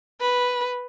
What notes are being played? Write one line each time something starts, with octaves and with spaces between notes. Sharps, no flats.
B4